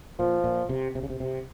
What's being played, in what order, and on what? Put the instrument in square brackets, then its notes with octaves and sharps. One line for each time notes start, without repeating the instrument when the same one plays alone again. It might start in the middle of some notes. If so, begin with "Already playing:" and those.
[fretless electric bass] A#2 [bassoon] F3
[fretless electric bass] A#2
C3
C3
C#3
C3
C3